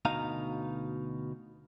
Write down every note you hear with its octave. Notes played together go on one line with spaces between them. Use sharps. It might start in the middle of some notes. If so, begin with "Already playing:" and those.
D2 B2 D#4 F5 A#5